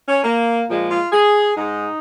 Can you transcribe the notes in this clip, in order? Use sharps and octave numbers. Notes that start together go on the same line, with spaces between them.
C#4
A#3
A#2 F3 G#3
F4
G#4
G#2 G#3 D#4